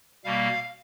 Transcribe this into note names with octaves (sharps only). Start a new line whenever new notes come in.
B2 G3 A#3 F5